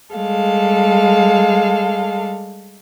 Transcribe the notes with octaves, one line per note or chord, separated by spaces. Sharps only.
G3 G#3 A4 F5